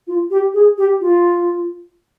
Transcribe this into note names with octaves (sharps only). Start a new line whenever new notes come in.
F4
G4
G#4
G4
F4